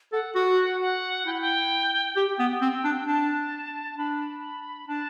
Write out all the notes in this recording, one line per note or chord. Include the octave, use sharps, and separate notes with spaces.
A4 F#5
F#4 F#5
F#5
E4 G5
F#5
G5
G4 G5
B3
C4
D4
D4 A5
D4 B5
D4 A5